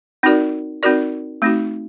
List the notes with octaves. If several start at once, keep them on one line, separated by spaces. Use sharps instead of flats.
C4 D#4 F#4 A#4 D5
C4 D#4 F#4 A#4 D5
A3 C4 D#4 F#4